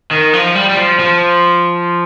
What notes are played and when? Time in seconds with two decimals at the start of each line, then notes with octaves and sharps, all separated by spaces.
0.11 D#3
0.33 F3
0.55 G3
0.69 G3
0.77 F3
0.99 F3